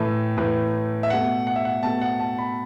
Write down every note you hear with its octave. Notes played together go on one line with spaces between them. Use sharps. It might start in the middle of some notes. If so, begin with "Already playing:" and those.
Already playing: A2 E3 A3 E5
A2 E3 A3
E5
B2 A3 F#5
F#5
E5
F#5
B2 A3 A5
F#5
A5
B5